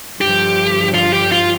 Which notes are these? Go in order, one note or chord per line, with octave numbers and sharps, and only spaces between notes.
G2 D3 F3 G4
F4
G4
F4